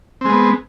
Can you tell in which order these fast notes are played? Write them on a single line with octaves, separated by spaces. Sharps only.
C4 G#3 B3